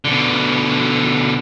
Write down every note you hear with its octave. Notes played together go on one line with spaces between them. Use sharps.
B2 D3